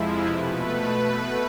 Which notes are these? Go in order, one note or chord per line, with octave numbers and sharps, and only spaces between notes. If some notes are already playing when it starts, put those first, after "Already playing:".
Already playing: F2 C3 F3 G#3 E4 F4
B2 A3 B4
B2 A3